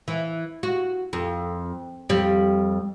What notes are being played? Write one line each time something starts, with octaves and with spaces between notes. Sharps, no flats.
E3
F#4
F2
F2 G3